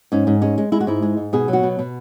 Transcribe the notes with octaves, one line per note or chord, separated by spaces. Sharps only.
G#2 C#4
G#2
G#3 C#4
G#3
G#3 E4
F#4
G#2 E4
G#3
G#2
B2 G#4
F#3
F#4
B2
B2